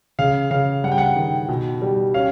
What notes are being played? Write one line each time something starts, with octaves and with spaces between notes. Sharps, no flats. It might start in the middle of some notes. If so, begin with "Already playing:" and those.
C#3 F5
C#3 F5
G2 F#5
G5
F#5
D#3
B2
G3
C#4 F5